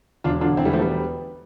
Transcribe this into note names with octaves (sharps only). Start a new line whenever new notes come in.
E1 D4 F4
D3 D4 F4
E1 C4 E4
E3 G3
F3 A3
G3 B3